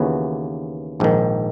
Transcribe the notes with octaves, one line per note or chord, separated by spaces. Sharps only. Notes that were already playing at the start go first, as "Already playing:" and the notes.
Already playing: D#2 C#3 E3 B3 F#4
A#1 G#2 D#3